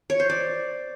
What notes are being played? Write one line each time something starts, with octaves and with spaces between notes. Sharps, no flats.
C#5
C5
D5